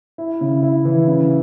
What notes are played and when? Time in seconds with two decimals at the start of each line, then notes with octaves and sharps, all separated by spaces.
0.18 E4
0.41 C#3
0.63 E4
0.85 E3
1.07 C#3